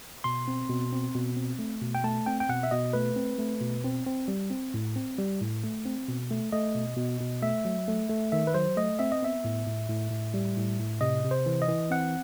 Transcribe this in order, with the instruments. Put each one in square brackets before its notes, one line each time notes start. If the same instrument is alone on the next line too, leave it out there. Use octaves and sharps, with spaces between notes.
[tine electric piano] B2 C6
C4
B2
C4
B2
C4
A3
B2
G5
A3 A5
C4 G5
G5
B2 F#5
E5
B2 D#5
A3 B4
C4
A3
B2
C4
C4
G3
C4
A2
C4
G3
A2
A3
C4
B2
A3
A3 D#5
B2
B2
B2
A3 E5
F#3
A3
A3
D#3 E5
B4
F#3 C5
A3 D#5
C4 E5
D#5
B3 E5
A2
A2
A2
A2
G3
A2
A2
C3 D#5
C3
C5
E3
D#5
E3
C4 F#5